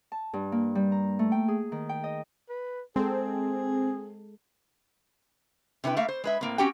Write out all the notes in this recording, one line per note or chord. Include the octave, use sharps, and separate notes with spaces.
A5
G2
A#3
G3
A#5
A3
G5
G#4
D#3
G5
D#5
B4
G#3 C4 G#4 A4
C3 C#4 E4 B4 G5
A3 A#3 E5 F5
C5
G#3 B4 E5
A2 A#3 C4
C4 C#4 F#4 G4 F#5 G5